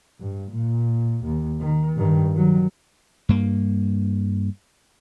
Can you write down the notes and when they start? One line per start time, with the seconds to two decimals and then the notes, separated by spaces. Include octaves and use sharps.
0.20 G2
0.51 A#2
1.24 D#2
1.60 D#3
1.97 G2 D#3
2.33 D#3 F#3
3.29 G2 A#3